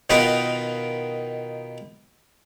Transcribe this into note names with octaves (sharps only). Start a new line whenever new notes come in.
B2 D#3 D#4 F4 A#4 B4